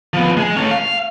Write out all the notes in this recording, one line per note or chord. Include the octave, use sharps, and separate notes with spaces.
F3 B3
G#3 G#4
A3 C#4
F5